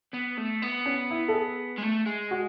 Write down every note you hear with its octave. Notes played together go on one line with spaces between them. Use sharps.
B3
A3
B3
C#4
E4
A4
G#4
G#3
A3
G#3
F#4